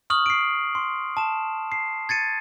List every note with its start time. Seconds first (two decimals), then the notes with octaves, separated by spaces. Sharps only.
0.10 C#6 D#6 F6 F#7
0.26 C7 D7
0.75 C6
1.17 A5 E7
1.72 C7
2.09 G#6 A6 C#7 D#7